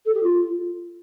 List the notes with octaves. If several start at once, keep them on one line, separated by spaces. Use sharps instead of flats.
A4
G4
F4